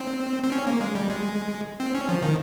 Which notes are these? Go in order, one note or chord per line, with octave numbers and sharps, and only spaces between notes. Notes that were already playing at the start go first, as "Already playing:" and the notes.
Already playing: C4
C4
C#4
A#3
G#3
G3
G#3
C4
C#4
F3
D#3